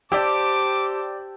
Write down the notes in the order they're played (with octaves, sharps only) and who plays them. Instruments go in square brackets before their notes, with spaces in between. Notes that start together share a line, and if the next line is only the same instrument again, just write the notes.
[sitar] G4 [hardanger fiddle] C5 A5 [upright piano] D5 E6 [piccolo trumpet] D6